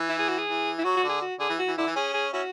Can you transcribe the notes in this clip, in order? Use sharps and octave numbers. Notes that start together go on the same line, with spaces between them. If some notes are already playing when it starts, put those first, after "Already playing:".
Already playing: E3
E4
G#4
F#4
G#4
E3
E4
F#3 F#4
F#4
D3
G#4
F#4
D3 G#4
E3
F#4
E3
D3 E4
E3
C#4 G#4
G#4
C#4 E4 F#4